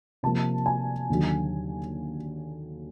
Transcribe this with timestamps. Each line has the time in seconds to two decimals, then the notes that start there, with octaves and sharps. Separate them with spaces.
0.23 C3 F3 A#3 A5
0.66 G#5
1.10 D#2 D3 F#3